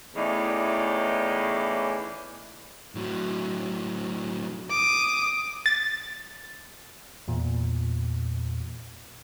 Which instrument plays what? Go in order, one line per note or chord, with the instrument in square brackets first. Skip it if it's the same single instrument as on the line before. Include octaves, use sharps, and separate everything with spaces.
[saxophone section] E2 A2 C#3 E3 D#4 D5
[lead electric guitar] A2 F#3
[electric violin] D6 D#6
[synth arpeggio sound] A6
[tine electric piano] E2 A#2